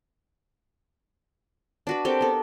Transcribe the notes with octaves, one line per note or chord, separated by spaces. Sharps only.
D4 F#4 B4
C4 G4 A4 A#4
B3 A4 A#4